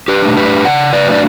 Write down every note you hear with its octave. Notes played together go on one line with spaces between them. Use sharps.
G4 B4
A3 D4
G4 B4
C#3 D5 F#5
B4 D5
F#3 A3 D4 D5